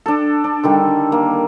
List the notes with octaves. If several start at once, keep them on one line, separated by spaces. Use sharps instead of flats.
D4 A4
D4
D3 D#3 G3 A4
A#3